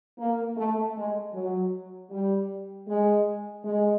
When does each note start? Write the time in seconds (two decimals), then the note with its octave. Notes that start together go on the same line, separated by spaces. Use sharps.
0.18 A#3
0.57 A3
0.96 G#3
1.34 F#3
2.11 G3
2.88 G#3
3.64 G#3